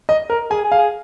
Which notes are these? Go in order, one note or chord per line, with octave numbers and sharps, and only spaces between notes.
D#5
A#4
G#4 G#5
G#4
F5
G#4